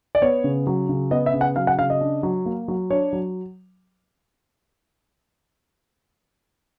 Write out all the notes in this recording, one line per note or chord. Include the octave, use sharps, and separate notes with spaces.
D5
B3 C#5
C#3
F#3
C#3
B3 D#5
E5
C#3
F#5
F#3 F5
F#5
C#3 F5
D#5
D4
F#3
A#3
F#3
D4 C#5
F#3